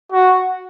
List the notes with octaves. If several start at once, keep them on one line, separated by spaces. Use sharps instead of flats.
F#4